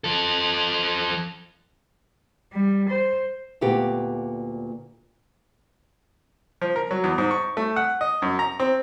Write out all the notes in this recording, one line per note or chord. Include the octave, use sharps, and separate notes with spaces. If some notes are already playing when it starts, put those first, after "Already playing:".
F3 A4
G3
C5
D2 A#2 B3 G4
F3
A#4
F#3
E2
G#2
C#6
A3
F#5
D#5
F#2
A#5
C4